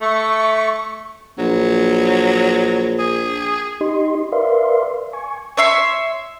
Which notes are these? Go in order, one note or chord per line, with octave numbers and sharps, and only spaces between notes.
A3 C#6
A#1 F#3
G#4
D#4 G4 D#5 C6
A#4 B4 D5 E5 F5 C6
G#5 C#6
C#5 E5 C6